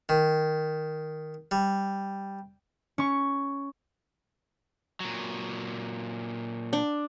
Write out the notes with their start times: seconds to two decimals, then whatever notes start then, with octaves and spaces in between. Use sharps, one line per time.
0.09 D#3
1.51 G3
2.98 C#4 C#6
5.00 A#2 F#3
6.73 D4